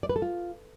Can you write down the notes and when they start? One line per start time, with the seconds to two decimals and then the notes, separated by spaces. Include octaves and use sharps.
0.03 D5
0.09 B4
0.16 A4
0.22 F4